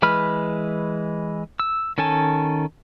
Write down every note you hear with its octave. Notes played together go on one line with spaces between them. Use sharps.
E3 G#3 B4 B5 F6
E6
D#3 C#4 A4 G#5 A5